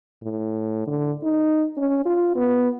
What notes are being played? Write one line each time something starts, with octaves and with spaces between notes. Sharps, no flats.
A2
D3
D#4
C#4
F4
B3